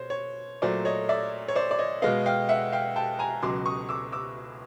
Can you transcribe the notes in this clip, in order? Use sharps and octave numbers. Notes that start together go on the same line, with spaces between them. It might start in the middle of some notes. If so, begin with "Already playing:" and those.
Already playing: B2 C5 C#5
C#5
A#2 F#3 A3 C5 D5
C#5 D#5
D5 E5
C#5
C5 D5
D5
C#5 D#5
B2 G#3 B3 D#5 F5
F5 G5
E5 F#5
F5 G5
G5 A5
G#5 A#5
C#2 B2 F#3 C6 D6
C#6 D#6
D6 E6
D6 E6